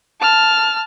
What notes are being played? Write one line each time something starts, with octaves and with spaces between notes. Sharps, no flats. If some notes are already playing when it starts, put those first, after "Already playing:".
A5 F6